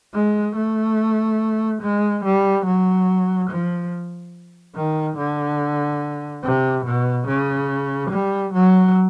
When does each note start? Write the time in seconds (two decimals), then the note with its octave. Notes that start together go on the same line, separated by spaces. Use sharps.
0.14 G#3
0.56 A3
1.82 G#3
2.24 G3
2.66 F#3
3.50 F3
4.76 D#3
5.18 D3
6.44 C3
6.85 B2
7.28 C#3
8.11 G3
8.53 F#3